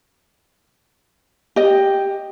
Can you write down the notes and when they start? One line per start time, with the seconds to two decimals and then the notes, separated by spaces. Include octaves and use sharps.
1.56 G4 D#5